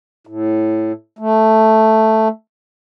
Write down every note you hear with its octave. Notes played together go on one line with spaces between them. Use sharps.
A2
A3